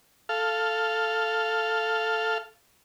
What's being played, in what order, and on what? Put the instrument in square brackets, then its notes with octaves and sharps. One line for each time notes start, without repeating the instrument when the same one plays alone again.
[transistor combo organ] A4 F5